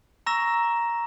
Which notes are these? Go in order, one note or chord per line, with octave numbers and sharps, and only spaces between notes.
A#5 C#6 E6 A#6 E7